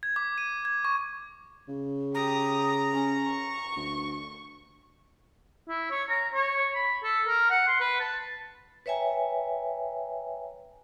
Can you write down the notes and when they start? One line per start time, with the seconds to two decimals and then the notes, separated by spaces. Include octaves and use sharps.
0.03 G#6
0.16 D6
0.38 D#7
0.65 G#6
0.85 C#6
1.68 C#3
2.15 G4 A#5 D#6
2.93 C#4
3.28 C#6
3.76 D2
5.69 E4
5.91 C#5
6.09 A#5
6.33 C#5
6.75 B5
7.03 A4
7.27 A#4
7.50 F#5
7.67 C6
7.80 B4
8.00 A5
8.86 B4 C#5 E5 G5 G#5 A#5